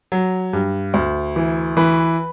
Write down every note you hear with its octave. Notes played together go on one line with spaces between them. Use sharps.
F#3
G2
D2
E3
E3 B4